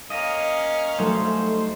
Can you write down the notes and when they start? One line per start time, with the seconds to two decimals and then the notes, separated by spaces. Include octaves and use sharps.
0.10 A#3 C#4 D#5 F5 D#6 A#6 D#7
0.99 F#3 G3 A3 D#4 C5